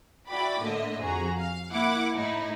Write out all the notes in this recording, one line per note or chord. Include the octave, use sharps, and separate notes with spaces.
E4 F#4 D5 G5 B5 D6
A2 D3 A#3 D#5 E5
F2 F#4 G#4 A#5
F5
A#3 E4 F#5 D6
A2 D#4 E4